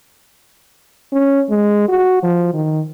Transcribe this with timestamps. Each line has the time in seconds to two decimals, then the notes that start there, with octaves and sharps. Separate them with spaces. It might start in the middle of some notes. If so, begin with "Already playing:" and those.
1.13 C#4
1.50 G#3
1.89 F#4
2.23 F3
2.54 D#3